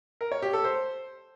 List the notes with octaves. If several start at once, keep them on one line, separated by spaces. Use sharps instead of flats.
A#4
C#5
G4
A4
C5